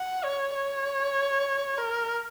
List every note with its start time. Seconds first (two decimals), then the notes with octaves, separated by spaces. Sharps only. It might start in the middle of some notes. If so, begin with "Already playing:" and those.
Already playing: F#5
0.24 C#5
0.55 C#5
1.78 A#4